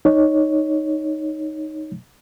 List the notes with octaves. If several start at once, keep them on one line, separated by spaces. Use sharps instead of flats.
D#4 C#5